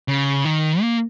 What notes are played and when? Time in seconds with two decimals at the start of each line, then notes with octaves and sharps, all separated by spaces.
0.08 C#3
0.45 D#3
0.81 A#3